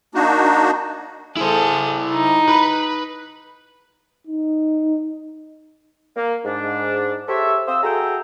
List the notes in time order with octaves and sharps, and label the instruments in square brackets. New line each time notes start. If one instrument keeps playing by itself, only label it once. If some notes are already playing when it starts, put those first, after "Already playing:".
[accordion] A#3 D4 D#4 F#4
[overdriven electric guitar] E4 C5 [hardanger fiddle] G#4 A4
[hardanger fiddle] D#4
[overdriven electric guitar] B4 B5
[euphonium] D#4
[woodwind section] A#3
G#2 D4
G4 A4 C5 C#5 E5
C4 C5 F5 D#6 E6
F#4 G#4 A4 E5 G5 A#5